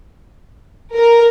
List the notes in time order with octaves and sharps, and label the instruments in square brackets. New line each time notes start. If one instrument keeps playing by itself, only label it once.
[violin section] A#4